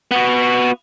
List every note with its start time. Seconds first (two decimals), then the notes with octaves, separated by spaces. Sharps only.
0.11 B3 F#4